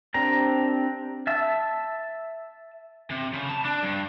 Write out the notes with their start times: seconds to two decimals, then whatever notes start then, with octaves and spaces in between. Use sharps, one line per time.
0.14 C4 D4 G4 A#4 A#5
1.27 E5 A5 E6
3.10 C3
3.33 C#3
3.49 A5
3.65 D4
3.83 G2